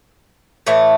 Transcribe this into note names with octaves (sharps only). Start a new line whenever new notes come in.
A2 E3 A3